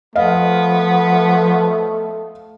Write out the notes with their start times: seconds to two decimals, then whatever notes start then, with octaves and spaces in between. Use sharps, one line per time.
0.15 F3 A3 B3 D#5 F5